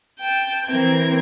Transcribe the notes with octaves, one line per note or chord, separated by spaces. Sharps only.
G5 A5
E3 C4 A#4 G#6